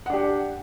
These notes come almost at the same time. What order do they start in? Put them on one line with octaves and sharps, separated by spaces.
F#5 D4 G4